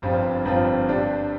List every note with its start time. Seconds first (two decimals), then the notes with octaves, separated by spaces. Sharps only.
0.02 G1 G2 F3 C4 F4
0.45 G1 G2 F3 C4 F4
0.89 G2 G3 D4